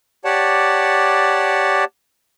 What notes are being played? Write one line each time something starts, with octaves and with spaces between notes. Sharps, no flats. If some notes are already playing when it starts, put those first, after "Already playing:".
G4 C#5 D5 F#5 A5